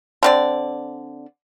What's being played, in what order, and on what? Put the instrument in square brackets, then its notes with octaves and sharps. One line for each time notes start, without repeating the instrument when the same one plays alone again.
[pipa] D3 C4 D5